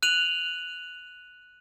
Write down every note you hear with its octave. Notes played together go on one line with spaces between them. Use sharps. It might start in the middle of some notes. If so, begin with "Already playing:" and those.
F#6 D#7 F7 F#7